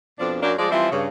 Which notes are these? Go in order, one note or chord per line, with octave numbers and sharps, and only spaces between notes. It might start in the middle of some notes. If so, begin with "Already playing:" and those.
F2 B2 F3 D4
F#2 A#3 D4
F3 G#3 D5
E3 F3 G3 C4 E4 F4
G2 C#3